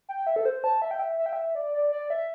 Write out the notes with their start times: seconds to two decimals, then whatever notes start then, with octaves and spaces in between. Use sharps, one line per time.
0.09 G5
0.27 E5
0.36 A4
0.45 C5
0.64 A5
0.82 E5
0.91 G5
0.99 E5
1.18 E5
1.26 G5
1.33 E5
1.55 D5
1.74 D5
1.92 D5
2.10 E5